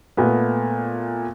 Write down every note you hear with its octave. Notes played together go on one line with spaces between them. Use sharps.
A#2 A3 B3